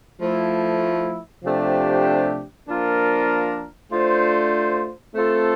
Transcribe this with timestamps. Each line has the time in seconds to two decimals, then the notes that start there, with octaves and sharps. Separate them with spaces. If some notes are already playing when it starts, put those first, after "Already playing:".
0.21 F3 A3 E4
1.44 C3 F3 A3 D4 G4
2.68 F3 A#3 D4 F4 A#4
3.92 A3 D4 F4 C5
5.15 A3 C4 F4 A4